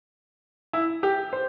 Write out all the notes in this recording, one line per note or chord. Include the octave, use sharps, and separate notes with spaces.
E4
G4
C5